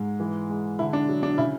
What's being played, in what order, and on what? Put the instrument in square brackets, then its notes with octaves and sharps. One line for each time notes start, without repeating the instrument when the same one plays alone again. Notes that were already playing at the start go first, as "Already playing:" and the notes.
Already playing: [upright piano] G#2 G#3
E3
G#3
D3 E4
D4
F#3
D4
C#3 E4